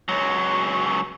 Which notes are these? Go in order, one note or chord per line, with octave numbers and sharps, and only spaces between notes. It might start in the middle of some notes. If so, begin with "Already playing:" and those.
C#2 F#3